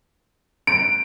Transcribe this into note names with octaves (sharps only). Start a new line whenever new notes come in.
D7